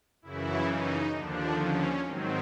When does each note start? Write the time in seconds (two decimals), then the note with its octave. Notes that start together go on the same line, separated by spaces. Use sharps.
0.22 F#2 C#3 E3 E4
0.67 D#4
1.13 D#2 D3 F3 D4
1.58 C#4
2.04 G#2 D#3 F#3 C4